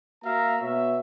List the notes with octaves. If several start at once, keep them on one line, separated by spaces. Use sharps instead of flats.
A#3 F#4 A#4 E5 F5 A#5
B2 B3 C#5 E5